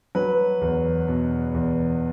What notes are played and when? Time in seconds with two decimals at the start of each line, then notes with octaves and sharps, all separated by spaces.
0.15 F#3 B4
0.61 E2
1.08 B2
1.55 E2